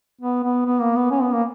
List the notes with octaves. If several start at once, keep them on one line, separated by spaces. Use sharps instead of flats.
B3
B3
B3
A#3
B3
C#4
B3
A#3